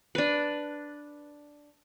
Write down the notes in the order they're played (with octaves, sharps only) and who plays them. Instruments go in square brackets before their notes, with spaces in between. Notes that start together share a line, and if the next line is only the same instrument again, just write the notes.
[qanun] D4 B4